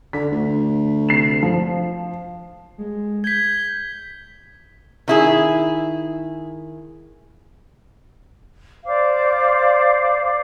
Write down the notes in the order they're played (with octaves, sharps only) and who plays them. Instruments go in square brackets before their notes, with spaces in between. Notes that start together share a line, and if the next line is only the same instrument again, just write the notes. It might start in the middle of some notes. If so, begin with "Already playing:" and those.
[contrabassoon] D3 [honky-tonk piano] B6
[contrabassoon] D2
[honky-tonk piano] C3 C7 E7
F3
[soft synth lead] G#3
[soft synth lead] G6 [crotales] G#6 B6
[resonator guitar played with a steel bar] D#3 E4 G#4
[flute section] C5 D5 F5 D6